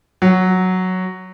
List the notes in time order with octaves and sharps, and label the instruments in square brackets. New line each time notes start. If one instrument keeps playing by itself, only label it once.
[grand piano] F#3